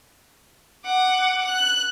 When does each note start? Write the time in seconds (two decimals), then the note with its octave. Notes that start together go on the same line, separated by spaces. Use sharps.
0.85 F#5 D6
1.44 F#6